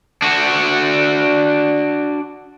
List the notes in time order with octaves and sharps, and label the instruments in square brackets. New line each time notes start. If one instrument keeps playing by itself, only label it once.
[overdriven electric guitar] D4 F#4